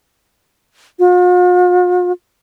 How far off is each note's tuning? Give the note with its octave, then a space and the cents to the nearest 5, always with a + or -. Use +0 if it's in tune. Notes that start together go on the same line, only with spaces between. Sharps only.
F4 +45